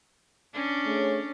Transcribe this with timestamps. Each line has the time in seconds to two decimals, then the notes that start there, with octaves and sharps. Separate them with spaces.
0.53 C#4 D4
0.85 A3 G#4 C#5